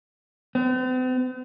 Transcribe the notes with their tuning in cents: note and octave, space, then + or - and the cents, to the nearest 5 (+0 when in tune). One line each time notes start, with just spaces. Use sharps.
C4 -45